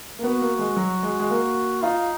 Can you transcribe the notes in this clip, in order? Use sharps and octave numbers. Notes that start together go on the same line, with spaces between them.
A#3
B3 F#4
A#3
G#3
F#3
G#3
G#3
A#3
D#4 F4